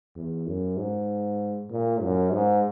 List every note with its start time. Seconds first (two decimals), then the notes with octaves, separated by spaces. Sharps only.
0.16 E2
0.47 F#2
0.77 G#2
1.71 A#2
2.02 F#2
2.33 G#2